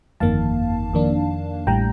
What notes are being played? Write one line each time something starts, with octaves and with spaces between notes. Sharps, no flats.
G1 F2 D#3 A#3 F5 A5
F2 D#3 A#3 D4
A1 A2 G3 G5 A#5